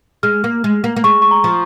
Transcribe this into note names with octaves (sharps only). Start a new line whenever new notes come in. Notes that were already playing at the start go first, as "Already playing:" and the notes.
G#3 F6
A#3
G#3
A#3
A#3
G#3 C#6
C#6
A#5
F3